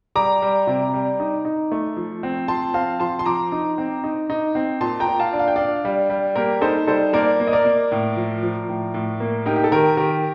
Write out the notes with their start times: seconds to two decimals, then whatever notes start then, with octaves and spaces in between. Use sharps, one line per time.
0.15 G3 A#5 D6
0.42 G3
0.67 C3
0.94 G3
1.20 D#4
1.45 D#4
1.72 A3
1.97 F3
2.23 C4
2.48 F3 A5 C6
2.74 C4 F5 A5
3.00 F3 A5 C6
3.19 C6
3.26 F3 A#5 D6
3.52 D#4
3.78 C4
4.04 D#4
4.30 D#4
4.55 C4
4.81 A#2 A5 C6
5.00 G5 A#5
5.07 A#2
5.19 F5 A5
5.33 D4
5.39 F5
5.48 G5
5.56 D4 D5 F5
5.85 G3
6.10 G3
6.36 A#3 G4 A#4
6.61 D#4 A4 C5
6.87 G3 A4 C5
7.13 A#3 A#4 D5
7.40 A#3
7.47 D#5
7.53 A#4 D5
7.65 A#3
7.92 A2
8.16 F3
8.43 F3
8.69 A2
8.94 A2
9.20 A#3
9.46 D#4 G4 A#4
9.56 G4
9.64 A4
9.72 D#3 G4 A#4
9.97 D#3 G4 A#4